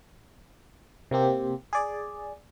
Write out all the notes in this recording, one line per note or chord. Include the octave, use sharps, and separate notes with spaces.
C3 A#3 C4 G4
G#4 D5